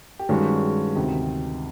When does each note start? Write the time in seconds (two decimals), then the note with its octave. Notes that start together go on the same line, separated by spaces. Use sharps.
0.19 G4
0.29 G2 D#3 G#3 C#4 F#4
0.96 D2 C3 D#3 G4